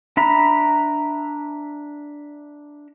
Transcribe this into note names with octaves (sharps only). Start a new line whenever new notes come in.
D4 E5 A#5 B5